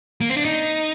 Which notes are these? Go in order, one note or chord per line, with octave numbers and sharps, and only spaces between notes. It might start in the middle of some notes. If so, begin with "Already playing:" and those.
A#3
C4
D4
D#4